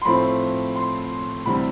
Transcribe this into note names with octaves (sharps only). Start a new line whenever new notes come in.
C6
A2 F3 A3 C4 B5
C6
D2 C3 E3 G3 C4 B5